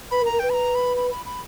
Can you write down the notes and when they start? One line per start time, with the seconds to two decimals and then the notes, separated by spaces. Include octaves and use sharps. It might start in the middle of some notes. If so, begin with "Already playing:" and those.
0.11 B4 B5
0.22 A#4
0.25 A#5
0.32 A#4
0.39 B4 G5
0.50 B5
0.54 A#5
0.75 B5
0.97 B5
1.11 B5
1.26 B5